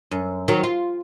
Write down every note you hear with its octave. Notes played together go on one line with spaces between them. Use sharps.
F#2
D#3 F#3
F4